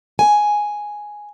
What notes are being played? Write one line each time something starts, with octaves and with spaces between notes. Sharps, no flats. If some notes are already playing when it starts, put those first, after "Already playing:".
G#5